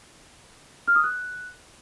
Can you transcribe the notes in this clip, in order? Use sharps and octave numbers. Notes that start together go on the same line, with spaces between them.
F6
D#6
F#6